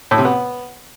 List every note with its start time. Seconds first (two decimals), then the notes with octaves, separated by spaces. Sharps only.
0.11 A2
0.18 C3
0.25 B3